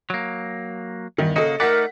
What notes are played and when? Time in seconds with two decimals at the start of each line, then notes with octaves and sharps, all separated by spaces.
0.10 F#3 A#3
1.18 E2 G2 D#3
1.36 C#3 A#3 F#4 A4 D#5
1.60 A3 D#4 A#4 D5 F#5 B6